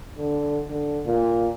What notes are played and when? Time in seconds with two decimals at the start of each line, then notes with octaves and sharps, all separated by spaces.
0.17 D3
0.70 D3
1.06 A#2